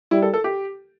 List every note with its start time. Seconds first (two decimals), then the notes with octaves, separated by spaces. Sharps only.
0.11 G3 E4
0.22 A4
0.34 A4
0.44 G4